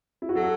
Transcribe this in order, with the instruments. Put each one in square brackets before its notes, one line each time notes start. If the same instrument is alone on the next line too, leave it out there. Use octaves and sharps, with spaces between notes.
[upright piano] E4
F#4
[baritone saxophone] F#3 [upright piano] A4